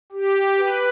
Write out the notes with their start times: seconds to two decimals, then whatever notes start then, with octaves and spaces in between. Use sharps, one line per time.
0.12 G4
0.58 B4